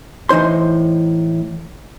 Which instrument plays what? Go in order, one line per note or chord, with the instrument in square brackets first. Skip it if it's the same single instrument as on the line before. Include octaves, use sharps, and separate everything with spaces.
[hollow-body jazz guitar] A2 E3 D#4 C5 C6